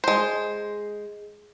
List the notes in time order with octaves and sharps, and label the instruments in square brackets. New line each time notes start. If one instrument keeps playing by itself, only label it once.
[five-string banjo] G#3 C5